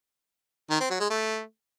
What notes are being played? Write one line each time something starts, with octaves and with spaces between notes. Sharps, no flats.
D#3
C4
F#3
G#3
A3